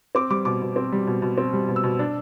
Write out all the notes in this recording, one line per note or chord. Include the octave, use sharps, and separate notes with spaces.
C4 D6
G3 D6
B2 D6
B2
C4
G3
B2
B2
C4
G3
B2
E6
B2
D4